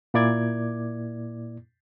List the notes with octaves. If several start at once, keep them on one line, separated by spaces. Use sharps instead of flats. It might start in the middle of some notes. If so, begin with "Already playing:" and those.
A#2 A#3 E4 D5 D6 G#6